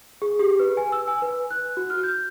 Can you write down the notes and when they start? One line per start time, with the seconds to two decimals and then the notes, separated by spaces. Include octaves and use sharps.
0.22 G#4
0.39 G4
0.59 B4
0.77 G#5
0.92 E6
1.08 G#5
1.22 B4
1.50 F#6
1.77 F#4
1.90 F6
2.03 G6